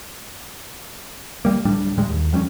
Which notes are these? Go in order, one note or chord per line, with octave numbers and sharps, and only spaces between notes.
G3 A#3
D1 A2 G3 D4
D2 A2 G3 G#3
D#2
F2 G3 C4 C#4